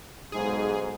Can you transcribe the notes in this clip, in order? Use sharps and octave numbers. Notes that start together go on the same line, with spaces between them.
B1 G#2 G#4